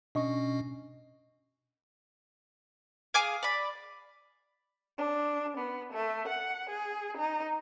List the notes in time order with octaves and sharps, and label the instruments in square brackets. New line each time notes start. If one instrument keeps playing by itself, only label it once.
[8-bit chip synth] B2 C#4 [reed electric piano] D4 D#5 C#6
[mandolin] G#4 F5 [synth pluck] G#5 D6 G#6
[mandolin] D5 B5
[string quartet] D4
B3
A3
F#5
G#4
D#4